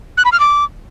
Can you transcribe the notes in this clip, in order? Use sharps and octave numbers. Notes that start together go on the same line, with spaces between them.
F#6
B5
F6
D6